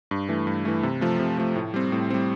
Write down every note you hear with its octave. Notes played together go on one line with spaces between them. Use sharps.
G2
E3 A3
G2
E3 A3
C3
F3 A3
C3
F3 A3
A2
G3 C4
A2
G3 C4